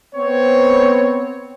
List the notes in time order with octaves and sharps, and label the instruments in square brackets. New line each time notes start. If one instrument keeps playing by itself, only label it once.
[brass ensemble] B3 C4 C#5